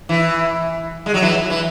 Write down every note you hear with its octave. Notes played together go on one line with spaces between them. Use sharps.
E3
G#3
F#3
E3
E3